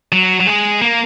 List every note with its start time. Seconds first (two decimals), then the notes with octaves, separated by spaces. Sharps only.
0.12 F#3
0.41 F#3
0.47 G#3
0.81 A#3